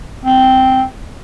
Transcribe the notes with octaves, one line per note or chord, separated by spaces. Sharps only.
C4